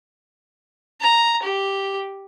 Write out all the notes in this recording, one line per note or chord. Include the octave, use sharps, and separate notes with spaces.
A#5
G4